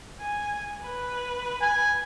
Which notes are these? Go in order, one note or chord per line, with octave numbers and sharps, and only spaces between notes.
G#5
B4
G#5